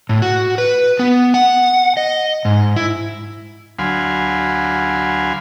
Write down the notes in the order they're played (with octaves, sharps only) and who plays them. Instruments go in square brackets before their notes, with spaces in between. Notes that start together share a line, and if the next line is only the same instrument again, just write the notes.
[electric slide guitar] A2
F#4
B4
B3
F#5
D#5
G#2
E4
[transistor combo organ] D2 F#3 F5 G#5 B5 C6